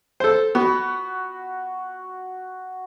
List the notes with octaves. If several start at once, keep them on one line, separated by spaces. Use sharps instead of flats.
A4 C5
B3 F#4